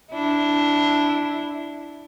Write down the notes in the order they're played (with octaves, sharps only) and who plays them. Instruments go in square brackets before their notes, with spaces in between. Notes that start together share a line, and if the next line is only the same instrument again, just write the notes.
[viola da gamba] D4 E4